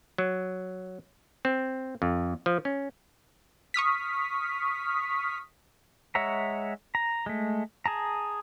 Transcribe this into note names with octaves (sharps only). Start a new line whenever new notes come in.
F#3
C4
F2
F3
C#4
C#6 D#6 F6 B6
G#3 C#5 E5 F#5 A#5
A#5
G#3 A3
G#4 A5 A#5